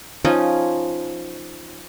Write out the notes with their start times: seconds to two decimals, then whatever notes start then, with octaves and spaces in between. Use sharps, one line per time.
0.25 F3 C#4 D#4